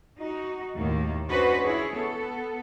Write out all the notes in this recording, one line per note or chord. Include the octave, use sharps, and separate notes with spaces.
D#4 F#4
D#2 A2 D#3 A#3
C#4 D4 F#4 B4 C5 D#5
E4 G#4 C#5
B3 A4